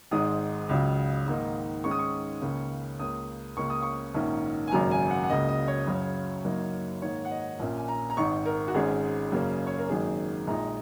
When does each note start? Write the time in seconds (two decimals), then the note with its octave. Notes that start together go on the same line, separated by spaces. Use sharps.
0.11 G#1 G#2 D#3 G#3 D#6
0.69 C#2 C#3 F#3
1.26 G#2 D#3 A#3 D#4
1.84 G#2 D#3 G#3 C#4 C#6
1.91 D#6
1.99 C#6
2.42 C#2 C#3 A#3 C#4
2.99 C#2 C#3 A#3 D#6
3.57 C#2 C#3 A#3 C#4 C#6
3.70 D#6
3.83 C#6
4.14 A#1 G#2 D#3 A#3 C#4
4.67 G#5
4.72 G#1 F#2 C#3 F#3 A#3 A#5
4.91 G#5
5.10 F#5
5.23 F#5
5.30 C#2 C#3 F#3 A#3 D#5
5.49 D#5
5.68 C#5
5.87 F#1 F#2 C#3 F#3
6.45 F#1 F#2 F#3 A#3 D#4
7.02 G#2 D#3 A#3 C#5
7.25 F#5
7.31 D#5
7.59 A#1 A#2 A#3 C#4
7.76 G#5
7.88 A#5
8.10 A#5
8.17 G#1 G#2 D#3 C#6
8.46 A#4
8.68 F#4
8.74 G#1 G#2 G#3 C#4 G#4
9.32 F#2 C#3 A#3 C#4
9.67 C#5
9.78 A#4
9.89 G#1 F#2 D#3 A#3 G#4
10.47 A#1 A#2 G#3 D#4 A#5